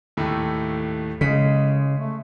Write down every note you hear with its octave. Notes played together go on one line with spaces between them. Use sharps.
D#2 A2 A3
C#3 G#3 B6
A3